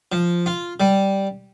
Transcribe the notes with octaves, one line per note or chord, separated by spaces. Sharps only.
F3
F4
G3